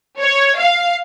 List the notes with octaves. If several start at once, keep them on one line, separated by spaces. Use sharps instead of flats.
C#5
F5